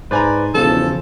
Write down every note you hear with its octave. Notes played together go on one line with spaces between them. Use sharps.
G#2 B4 C5 D5 G#5 A#5
E1 E2 C#3 F3 A4